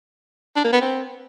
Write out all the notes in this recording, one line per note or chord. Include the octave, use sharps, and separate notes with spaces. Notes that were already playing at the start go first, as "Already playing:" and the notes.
D4
A#3
B3
C4